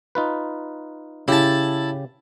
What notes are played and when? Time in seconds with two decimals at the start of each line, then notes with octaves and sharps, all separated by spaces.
0.15 D#4 F4 B4
1.28 C#3 E4 G4 A5